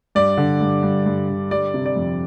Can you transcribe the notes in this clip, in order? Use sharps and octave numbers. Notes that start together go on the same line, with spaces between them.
G2 D5
D3
G2
G2
G2
D3
G3 D5
C3
D5
F2